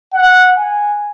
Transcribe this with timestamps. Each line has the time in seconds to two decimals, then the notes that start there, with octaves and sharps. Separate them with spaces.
0.13 F#5
0.56 G#5